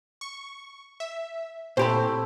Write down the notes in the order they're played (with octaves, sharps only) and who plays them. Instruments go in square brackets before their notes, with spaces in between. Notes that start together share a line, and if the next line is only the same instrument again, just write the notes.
[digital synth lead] C#6
E5
[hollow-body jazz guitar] A#2 G4 B5 [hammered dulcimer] A3 C4 E4 [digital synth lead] C5